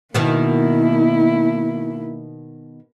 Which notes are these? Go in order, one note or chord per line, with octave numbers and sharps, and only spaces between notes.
B2 D#3 A#3 B3 E4